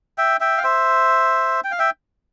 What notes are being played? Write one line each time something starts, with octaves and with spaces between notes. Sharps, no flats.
E5 G5
E5 G5
F5
C5 E5
G5
F5
E5 G5